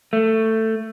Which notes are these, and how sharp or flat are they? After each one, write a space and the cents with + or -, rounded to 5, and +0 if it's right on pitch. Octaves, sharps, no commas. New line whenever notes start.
A3 +15